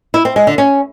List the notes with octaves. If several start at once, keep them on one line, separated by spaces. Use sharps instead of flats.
E4
C4
G#3
D3
C#4